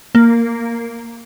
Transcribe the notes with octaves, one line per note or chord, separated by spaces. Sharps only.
A#3